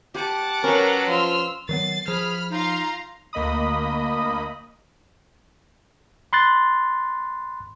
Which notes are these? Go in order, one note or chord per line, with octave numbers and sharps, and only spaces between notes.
G4 F#5 A5 D6
F#3 C#4 A#4 B4
F3 C6 E6 F6
D#3 F#3 B3 A6 C7
F3 G#4 B5 F6
D#4 F4 F5 A#5 C6
D2 A#3 D#5 B5 D#6
B5 C6 F#6 A6